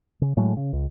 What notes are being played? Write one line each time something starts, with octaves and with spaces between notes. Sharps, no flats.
C#3
A2 F#3 G#3 A3
C#3
C#2